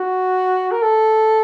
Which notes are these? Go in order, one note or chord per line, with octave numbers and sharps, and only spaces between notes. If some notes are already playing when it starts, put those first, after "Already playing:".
Already playing: F#4
A#4
A4